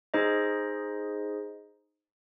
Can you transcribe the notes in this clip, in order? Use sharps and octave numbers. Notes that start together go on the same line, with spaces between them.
D#4 G#4 C5 D#5